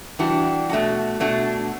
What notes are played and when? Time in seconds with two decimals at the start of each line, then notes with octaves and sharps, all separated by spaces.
0.19 E3 G3 D4 F#4
0.69 B2 A3 D4 F#4
1.20 B2 A3 D4 F#4